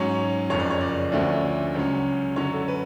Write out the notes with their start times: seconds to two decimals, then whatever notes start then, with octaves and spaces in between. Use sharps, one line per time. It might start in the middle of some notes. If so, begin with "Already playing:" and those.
Already playing: G#2 F#3 C#4 C#5
0.50 F#1 F2 C#3 C#5
0.60 D5
0.70 C#5
0.81 D5
1.12 D2 D3 F3 A3 C#4 D5
1.74 C#2 C#3 F#3 C#4
2.36 F#2 D3 F#3 C#4 C#5
2.52 A4
2.68 B4